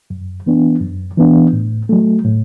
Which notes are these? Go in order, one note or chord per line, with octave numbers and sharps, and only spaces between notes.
F#2
E3 B3 D4
F#2
E3 B3 D4
A2
F#3 A3
A2